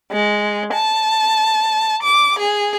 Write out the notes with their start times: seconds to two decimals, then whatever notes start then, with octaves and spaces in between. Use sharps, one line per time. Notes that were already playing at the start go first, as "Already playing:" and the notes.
0.12 G#3
0.74 A5
2.03 D6
2.39 G#4